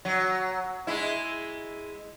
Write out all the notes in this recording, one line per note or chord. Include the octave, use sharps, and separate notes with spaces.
F#3
G#3 E4